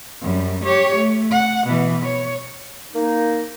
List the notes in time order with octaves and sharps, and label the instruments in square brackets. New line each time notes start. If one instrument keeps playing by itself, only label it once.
[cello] F#2 G3
G4 C#5
A3
F#5
B2 E3
C#5
[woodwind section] A#3 D#4